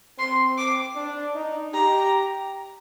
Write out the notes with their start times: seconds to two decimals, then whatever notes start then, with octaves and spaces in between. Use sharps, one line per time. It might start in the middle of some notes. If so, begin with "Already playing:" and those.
0.18 C4 C6
0.58 D6
0.96 D4
1.35 D#4
1.74 G4 A#5